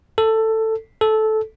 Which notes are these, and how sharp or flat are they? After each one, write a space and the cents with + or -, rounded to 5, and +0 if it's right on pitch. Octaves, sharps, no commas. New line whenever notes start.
A4 +10
A4 -15